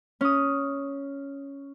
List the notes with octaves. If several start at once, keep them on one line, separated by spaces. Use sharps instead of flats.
C#4 D#6